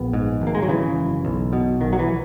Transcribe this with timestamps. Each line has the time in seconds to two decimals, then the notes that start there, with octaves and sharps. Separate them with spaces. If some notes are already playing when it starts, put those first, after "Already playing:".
Already playing: A#1 B3
0.13 G#2
0.42 G#1
0.47 A#3
0.55 G#3
0.62 F#3
0.69 C#3 E3
0.96 F#1
1.25 B1
1.53 B2
1.80 B1 D#3
1.93 F#3
1.99 E3